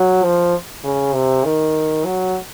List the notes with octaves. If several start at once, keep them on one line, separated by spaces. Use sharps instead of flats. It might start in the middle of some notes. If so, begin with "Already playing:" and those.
Already playing: F#3
F3
C#3
C3
D#3
F#3